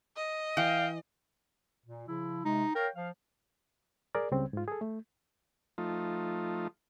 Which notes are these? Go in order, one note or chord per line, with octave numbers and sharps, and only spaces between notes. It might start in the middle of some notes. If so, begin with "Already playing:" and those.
D#5
E3 F5 G5
A#2
C#3 F3 E4
C3 G#3 D#4
A#4 C#5 F5 G5
F3 F5
G#4 A#4 D5
C#2 C#3 G3 C4
G#2 F4
G#4 A4
A3
F3 A3 D#4 F4